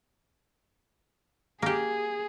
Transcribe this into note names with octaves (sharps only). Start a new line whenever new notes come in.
A#3 G4 G#4